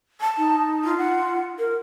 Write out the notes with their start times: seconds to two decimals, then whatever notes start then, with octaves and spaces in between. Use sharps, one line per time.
0.21 A5
0.38 D#4
0.84 F4
0.98 F#5
1.59 A#4